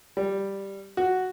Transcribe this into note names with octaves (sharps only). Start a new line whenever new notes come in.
G3
F#4